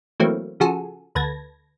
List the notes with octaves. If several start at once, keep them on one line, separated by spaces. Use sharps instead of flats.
E3 F#3 A3 A#3 C4
C#3 F3 F#4 G#4 A4
D2 B4 A5 G#6 A#6